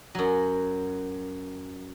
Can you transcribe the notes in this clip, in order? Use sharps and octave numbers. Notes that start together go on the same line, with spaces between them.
F#2 F#3